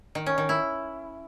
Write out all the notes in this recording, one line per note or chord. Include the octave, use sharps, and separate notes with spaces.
D#3
C#4
D#3
E4